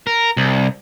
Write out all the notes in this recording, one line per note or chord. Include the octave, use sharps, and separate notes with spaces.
A#4
C2